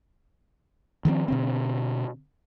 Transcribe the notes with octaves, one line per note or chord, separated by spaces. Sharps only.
D#3 F3 G#3 C4
B2 D3 C4